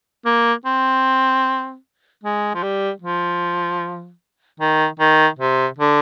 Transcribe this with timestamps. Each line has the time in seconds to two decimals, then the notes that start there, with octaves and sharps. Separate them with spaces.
0.26 A#3
0.66 C4
2.24 G#3
2.55 F3
2.63 G3
3.02 F3
4.60 D#3
5.00 D#3
5.39 C3
5.78 D3